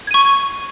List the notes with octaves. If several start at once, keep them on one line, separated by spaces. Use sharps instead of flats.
C#6 G#6 D#7